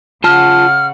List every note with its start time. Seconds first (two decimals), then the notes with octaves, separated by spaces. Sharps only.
0.24 C#3 F4 F#5 A5 F6